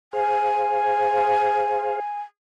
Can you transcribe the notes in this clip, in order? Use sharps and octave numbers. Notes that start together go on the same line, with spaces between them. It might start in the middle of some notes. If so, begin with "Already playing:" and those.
G#4 C5 F5 G#5